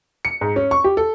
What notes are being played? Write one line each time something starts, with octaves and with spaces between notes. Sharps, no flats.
C#7
G#2
C#4
C#6
G4
A4